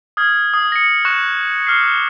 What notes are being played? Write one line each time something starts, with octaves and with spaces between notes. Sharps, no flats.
D#6 F6 G#6
D#6
A#6 C#7
C#6 F#6 A#6 E7
D6 F6 C7